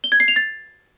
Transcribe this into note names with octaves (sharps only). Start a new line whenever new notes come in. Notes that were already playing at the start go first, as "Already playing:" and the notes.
G7
G#6
C7
F7
A6